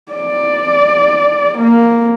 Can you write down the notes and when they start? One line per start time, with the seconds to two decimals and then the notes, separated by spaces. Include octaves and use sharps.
0.12 D5
1.58 A#3